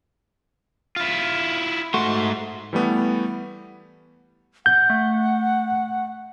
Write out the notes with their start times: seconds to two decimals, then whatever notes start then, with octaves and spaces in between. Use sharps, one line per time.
0.96 E4 F4
1.94 G#2 A3 F#4 C6
2.73 E3 G3 A3 B3
4.66 F#5 G6
4.90 A3